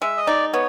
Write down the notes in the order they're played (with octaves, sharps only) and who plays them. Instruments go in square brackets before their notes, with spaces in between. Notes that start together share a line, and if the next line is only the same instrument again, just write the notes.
[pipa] G#3 [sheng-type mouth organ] E5
[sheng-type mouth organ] D#5
[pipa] D#4 [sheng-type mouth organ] D5
[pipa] B3 [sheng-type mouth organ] C#5